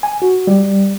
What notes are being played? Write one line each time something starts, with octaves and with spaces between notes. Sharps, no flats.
G#5
F#4
G3